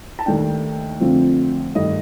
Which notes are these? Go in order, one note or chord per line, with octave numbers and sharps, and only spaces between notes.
A5
D#2 D#3 A3 D4 G5
F2 D3 F3 A3 C4
G2 D#3 A3 D#5